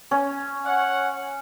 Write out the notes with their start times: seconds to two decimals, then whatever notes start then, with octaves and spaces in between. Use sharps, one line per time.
0.11 C#4
0.65 C#5 F#5